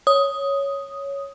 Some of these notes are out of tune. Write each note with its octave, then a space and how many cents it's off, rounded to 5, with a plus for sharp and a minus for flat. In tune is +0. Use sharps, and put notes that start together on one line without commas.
C#5 +0 D#6 +0